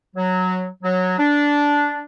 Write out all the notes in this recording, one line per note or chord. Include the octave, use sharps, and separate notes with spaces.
F#3
F#3
D4